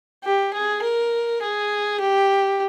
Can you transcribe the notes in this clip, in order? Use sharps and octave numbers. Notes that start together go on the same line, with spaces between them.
G4
G#4
A#4
G#4
G4